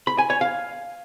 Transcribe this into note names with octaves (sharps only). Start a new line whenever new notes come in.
B5
G#5
C#5
F5